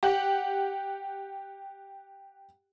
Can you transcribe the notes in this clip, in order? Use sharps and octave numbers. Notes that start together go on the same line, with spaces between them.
G4 F#5